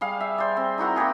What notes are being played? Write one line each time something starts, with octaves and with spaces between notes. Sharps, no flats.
G3 G#4 F5
E5
C5 D5
C4
D#4 E4 F#4 A#4
A#3 E4 G4 G#4